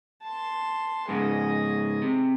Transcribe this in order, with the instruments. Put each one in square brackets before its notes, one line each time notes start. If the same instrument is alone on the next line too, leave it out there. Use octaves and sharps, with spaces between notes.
[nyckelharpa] A5 C6
[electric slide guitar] G#2 C#3 [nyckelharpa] G#4 D#5
[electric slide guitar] C3